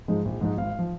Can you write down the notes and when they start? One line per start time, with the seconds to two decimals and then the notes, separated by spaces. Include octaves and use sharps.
0.08 G#2 F3 G#3 D#4
0.25 A#1
0.41 G#2 F3 G#3 D#4
0.57 G#1 F5
0.79 F3